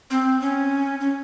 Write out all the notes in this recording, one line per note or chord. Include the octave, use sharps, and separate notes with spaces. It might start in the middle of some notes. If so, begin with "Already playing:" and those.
C4
C#4
C#4